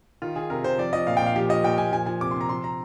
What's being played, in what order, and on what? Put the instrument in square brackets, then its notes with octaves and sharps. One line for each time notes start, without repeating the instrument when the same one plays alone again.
[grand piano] D#3 F4
D#3 G#4
C3 A#4
C3 C5
F3 D5
F3 D#5
A#2 F5
G5
A#2 F5
F3 G4
F3 D#5
A#2 G5
A#2 G#5
F3 G#5
F3 G#5
C3 D6
C6
C3
A#5
F3 C6
F3 A#5